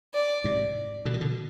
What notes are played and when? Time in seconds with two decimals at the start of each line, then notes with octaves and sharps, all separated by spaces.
0.14 D5
0.44 G#2 C3
1.05 B2 D3
1.14 D#3
1.21 B2 D3